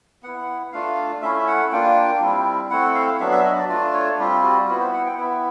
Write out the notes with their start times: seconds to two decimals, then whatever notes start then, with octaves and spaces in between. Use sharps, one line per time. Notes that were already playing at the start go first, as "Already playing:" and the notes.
0.23 B3 E4 F#5
0.72 A3 D4 F4 F5
1.22 A3 C#4 E4 E5
1.47 F#5
1.71 A#3 D4 F4 G5
2.21 G3 C4 E4
2.70 A3 C4 E4 F#5
2.95 F5
3.20 F#3 B3 D4 E5
3.32 E5
3.44 D#5
3.58 D5
3.69 A3 D4 F4 D5
3.94 C#5
4.18 G3 C4 F4 G4
4.43 F#4
4.68 B3 E4 F#4
4.80 C5
4.94 F#5
5.06 G5
5.17 B3 E4